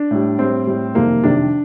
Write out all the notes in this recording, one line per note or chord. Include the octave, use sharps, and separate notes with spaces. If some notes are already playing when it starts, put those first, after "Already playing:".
Already playing: D4
A2 G3
A2 G3 C4
A2 G3
F2 C3 D#3 G3 A#3
F2 C3 D#3 G3 D4